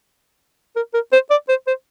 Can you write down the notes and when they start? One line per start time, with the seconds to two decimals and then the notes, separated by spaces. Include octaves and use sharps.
0.76 A#4
0.94 A#4
1.13 C5
1.30 D5
1.49 C5
1.67 C5